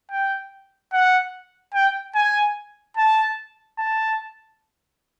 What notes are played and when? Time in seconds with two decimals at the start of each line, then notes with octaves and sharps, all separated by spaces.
0.11 G5
0.93 F#5
1.74 G5
2.15 G#5
2.97 A5
3.78 A5